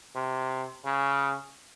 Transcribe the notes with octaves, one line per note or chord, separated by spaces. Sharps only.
C3
C#3